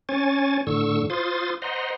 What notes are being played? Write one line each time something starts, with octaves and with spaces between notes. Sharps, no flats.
C#4 C#5 G#5 A6
A2 D3 C#6 E6
F4 C5 C6 D#6 A6
C5 D#5 F#5 A#5 C6